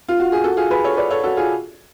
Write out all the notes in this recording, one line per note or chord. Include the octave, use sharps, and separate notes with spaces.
F4
F#4
G#4
F#4 A4
F4 G#4
G#4 B4
A4 C#5
B4 D5
A4 C#5
F#4 A4
F4 G#4